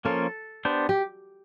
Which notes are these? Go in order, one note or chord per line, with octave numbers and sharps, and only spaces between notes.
F3 A#3 C#4 F4 A4 A#4
B3 D4 G4 C5
G4